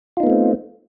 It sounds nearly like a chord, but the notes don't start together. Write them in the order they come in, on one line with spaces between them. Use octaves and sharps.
F4 D#4 B3 A3 C4